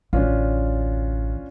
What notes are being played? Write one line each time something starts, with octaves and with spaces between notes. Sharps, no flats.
A1 D2 C#4 D4 F4